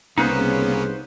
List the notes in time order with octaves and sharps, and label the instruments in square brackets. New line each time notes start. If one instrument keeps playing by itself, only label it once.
[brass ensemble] C2 C#3 [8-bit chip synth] A#3 B3 C#4 [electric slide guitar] D#4 B4 C5